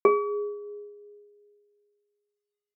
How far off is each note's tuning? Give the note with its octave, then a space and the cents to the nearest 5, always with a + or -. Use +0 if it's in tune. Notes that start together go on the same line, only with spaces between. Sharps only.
G#4 -10